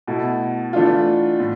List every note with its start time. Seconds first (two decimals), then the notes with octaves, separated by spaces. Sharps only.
0.07 B2 A3 E4
0.73 E3 A3 D4 F4
1.40 A2